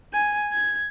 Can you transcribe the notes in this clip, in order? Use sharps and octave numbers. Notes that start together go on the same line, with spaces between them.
G#5
G#6